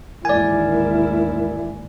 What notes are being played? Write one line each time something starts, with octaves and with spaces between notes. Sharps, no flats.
A1 D#2 G#2 E4 A#4 D5 G#5